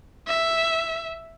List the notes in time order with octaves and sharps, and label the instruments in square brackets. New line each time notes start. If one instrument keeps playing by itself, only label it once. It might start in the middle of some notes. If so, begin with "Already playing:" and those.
[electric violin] E5